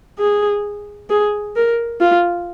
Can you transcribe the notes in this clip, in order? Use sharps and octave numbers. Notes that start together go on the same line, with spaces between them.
G#4
G#4
A#4
F4